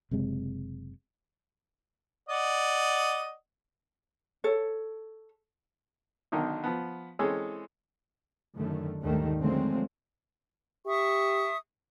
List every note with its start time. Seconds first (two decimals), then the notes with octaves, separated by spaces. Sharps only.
0.11 F#1 C3 G#3 C4
2.29 D5 D#5 F#5
4.44 A4 C#5
6.32 B1 D3 D#3 D#4 A#4
6.64 F3 B3
7.19 E3 G#3 C4 C#4 G#4 A4
8.55 F#2 D3 D#3 A3
9.03 D#2 G#2 D3 D#3 G3 A3
9.40 D3 F3 F#3 G#3 A3 C4
10.86 G4 E5 C#6 D#6